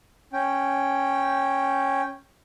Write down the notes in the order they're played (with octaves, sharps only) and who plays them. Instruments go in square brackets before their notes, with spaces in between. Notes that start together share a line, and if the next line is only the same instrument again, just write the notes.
[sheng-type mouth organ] C#4 G5